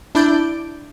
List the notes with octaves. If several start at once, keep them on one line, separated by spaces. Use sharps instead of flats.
D4 E4 D5 G6 D7